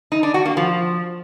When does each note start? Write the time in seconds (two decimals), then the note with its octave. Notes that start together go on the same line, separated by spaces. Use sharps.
0.12 D#4
0.23 D4
0.34 F#4
0.46 A#3
0.57 F3